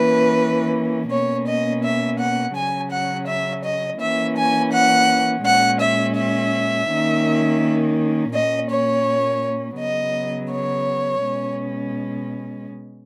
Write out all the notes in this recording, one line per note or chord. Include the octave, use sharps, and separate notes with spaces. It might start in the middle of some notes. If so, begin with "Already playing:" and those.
Already playing: E3 A#3 C#4 B4
B2 A#3 C#4 C#5
D#5
E5
F#5
C#3 F#3 C#4 G#5
F#5
E5
D#5
E3 A#3 C#4 E5
G#5
F#5
A#2 G#3 C#4 F#5
E5
E5
D#3 A#3 C#4
A#2 A#3 C#4 D#5
C#5
C#3 F#3 B3 D#5
C#5
B2 G#3 C#4